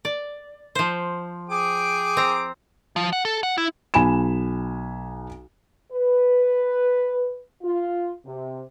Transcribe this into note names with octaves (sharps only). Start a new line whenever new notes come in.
D5
F3 C5
G#4 G5 D6
C4 A#5
F3
F#5
A4
F#5
E4
B1 G#5 B5 E7
B4
F4
C3